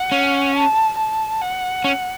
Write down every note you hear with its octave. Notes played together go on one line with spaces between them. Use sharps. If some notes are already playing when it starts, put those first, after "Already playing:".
Already playing: F#5
C#4
A5
A5
F#5
C#4